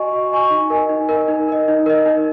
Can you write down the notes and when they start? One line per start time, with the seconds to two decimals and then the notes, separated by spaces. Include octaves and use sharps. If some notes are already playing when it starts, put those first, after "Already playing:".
Already playing: F#4 D#5 G#5 C#6
0.13 F#4
0.32 D#5 G#5 C#6
0.50 D#4
0.70 A#4 D#5 G#5
0.89 D#4
1.09 A#4 D#5 G#5
1.28 D#4
1.49 A#4 D#5
1.68 D#4
1.86 A#4 D#5
2.06 D#4